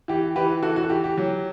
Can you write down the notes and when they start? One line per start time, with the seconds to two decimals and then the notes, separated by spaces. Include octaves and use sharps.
0.08 E3 G4
0.36 E3 G4 B4
0.63 E3 F#4 A4
0.76 F#4
0.83 A4
0.90 E3 G4
1.04 G4
1.18 F#3